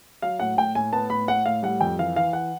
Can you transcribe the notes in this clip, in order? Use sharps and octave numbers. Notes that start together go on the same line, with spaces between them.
F#3 F5
A2 F#5
A2 G5
A2 G#5
B3 A5
A2 B5
A2 F#5
A2 F5
G3 F#5
F2 G5
E3 F5
E3 F5
F#5